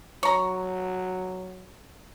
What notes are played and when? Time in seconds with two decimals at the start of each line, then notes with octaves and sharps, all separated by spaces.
0.23 F#3 C#5 A#5